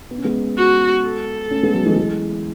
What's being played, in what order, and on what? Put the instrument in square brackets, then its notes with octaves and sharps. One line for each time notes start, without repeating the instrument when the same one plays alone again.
[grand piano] B3
C#4
G#3 B3
[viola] F#4
A4
[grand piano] A3 C#4
G#3 B3
F#3 A3
E3 G#3
E3 G#3